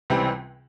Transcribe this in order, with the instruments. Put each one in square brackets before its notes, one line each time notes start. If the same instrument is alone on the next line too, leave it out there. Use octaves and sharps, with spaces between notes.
[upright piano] C#2 C3 E3 G3 C4